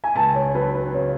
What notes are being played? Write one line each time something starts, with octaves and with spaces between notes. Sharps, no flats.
G#5
C#2 A5
C#5
F#3 B4
B4
C#3 C#5